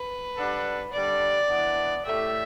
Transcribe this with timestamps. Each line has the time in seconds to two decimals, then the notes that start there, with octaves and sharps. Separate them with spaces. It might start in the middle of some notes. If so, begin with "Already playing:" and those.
Already playing: B4
0.36 G3 B3 D4 A4
0.93 D3 G3 D4 D5
1.49 E3 B3 D4
2.06 A2 A3 G4 E5